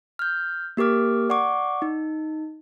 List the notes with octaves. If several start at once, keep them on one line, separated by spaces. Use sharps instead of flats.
F6 G6
A#3 G4 A#4 D6 F6
D5 F#5 C#6 D6
D#4